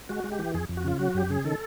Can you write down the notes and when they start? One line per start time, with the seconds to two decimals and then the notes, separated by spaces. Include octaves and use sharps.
0.09 G#3 F#4
0.24 G#3
0.32 G4
0.39 E3
0.54 F2 G#4
0.69 F2
0.77 F#4
0.84 C#3 F4
0.99 F#3 F#4
1.15 F#2 G4
1.30 C#3 G#4
1.45 D#3 A4